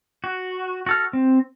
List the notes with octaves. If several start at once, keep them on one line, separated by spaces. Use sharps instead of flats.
F#4
F#4 A4 F6
C4